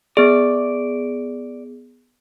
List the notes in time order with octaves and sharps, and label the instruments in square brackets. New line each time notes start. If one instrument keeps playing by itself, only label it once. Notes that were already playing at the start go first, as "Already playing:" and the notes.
[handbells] B3 G#4 [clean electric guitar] D5